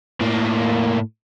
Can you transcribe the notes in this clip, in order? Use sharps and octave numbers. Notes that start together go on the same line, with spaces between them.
A2 A#3